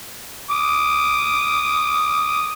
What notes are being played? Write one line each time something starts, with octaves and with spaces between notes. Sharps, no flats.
D6 D#6